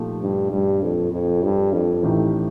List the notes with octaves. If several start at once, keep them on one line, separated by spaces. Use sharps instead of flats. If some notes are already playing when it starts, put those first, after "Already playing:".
Already playing: A#2 F3 A3 D#4 G4
G2
G2
F2
F2
G2
F2
A1 A2 A3 D#4 G4